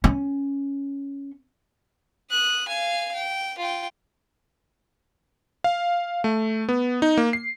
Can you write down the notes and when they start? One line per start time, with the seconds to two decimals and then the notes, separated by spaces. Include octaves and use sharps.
0.04 C#4
2.31 D#6 F#6
2.68 F5 G#5
3.14 G5
3.58 F4 G5
5.64 F5
6.24 A3
6.69 B3
7.02 D#4
7.17 A#3
7.33 C7